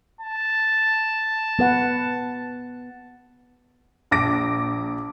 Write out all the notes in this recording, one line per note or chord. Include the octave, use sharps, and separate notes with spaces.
A5
B3 B4 F#5
A#1 D6 A#6 D7